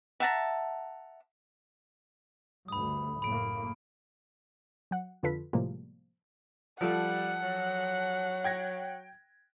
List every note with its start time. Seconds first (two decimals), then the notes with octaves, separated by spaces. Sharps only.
0.20 E5 F#5 A5 A#5
2.68 D2 G2 B5 D#6
3.22 F#1 A2 A#3 B5 D7
4.91 F#3 F#5
5.23 F2 D3 F4 A4 B4 B6
5.53 A2 C3 F3 G3 G#3 A#3
6.81 F3 G3 F4 A4 F#5
7.43 F#3
8.44 G5 G#6 A#6